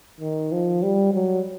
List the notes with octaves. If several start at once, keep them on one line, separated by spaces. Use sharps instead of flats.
D#3
F3
G3
F#3